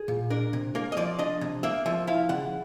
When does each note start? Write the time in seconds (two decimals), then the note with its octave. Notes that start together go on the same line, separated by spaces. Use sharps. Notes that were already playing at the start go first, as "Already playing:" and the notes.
Already playing: G#4
0.08 A#2
0.30 D4 A#4
0.53 C3
0.75 A#3 A#4
0.92 D#5
0.97 F3 D5
1.19 D4 D#5
1.41 C3
1.63 A#3 E5
1.86 F3 E5
2.07 E4 F5
2.29 C#3 F#5